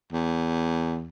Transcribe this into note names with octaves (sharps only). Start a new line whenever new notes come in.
E2